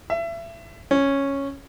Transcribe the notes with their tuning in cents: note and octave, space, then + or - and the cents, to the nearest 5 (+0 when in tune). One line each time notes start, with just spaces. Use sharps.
E5 +30
C#4 -5